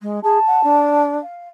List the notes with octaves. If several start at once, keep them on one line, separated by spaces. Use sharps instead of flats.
G#3
G#4 A5
F#5
D4
F5